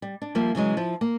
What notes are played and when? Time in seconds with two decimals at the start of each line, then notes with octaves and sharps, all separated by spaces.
0.02 G3
0.22 D4
0.35 F3 G3 A#3 F4 E5
0.55 C#3 E3 F#3 G#3
0.77 F3 E4
1.01 A#3